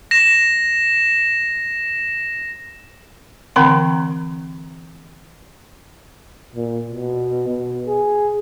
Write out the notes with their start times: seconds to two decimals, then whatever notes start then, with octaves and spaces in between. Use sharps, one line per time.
0.11 A#6 E7
3.56 D3 E3 C4 F#5 A#5 C6
6.55 A#2
6.90 B2
7.48 B2
7.87 G#4